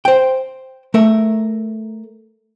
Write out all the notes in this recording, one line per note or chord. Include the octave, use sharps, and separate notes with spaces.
C5 G5
A3 A#4 E5